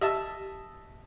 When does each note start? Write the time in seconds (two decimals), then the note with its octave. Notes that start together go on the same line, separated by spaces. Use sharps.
0.01 G4 D#5 E5 A5